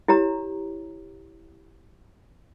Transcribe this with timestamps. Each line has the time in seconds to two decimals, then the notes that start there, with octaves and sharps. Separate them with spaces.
0.08 E4 G4 C#5 A#5